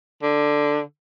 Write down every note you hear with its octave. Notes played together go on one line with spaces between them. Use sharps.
D3